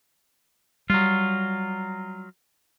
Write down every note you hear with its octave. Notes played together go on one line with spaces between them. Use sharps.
F#3 G3 F4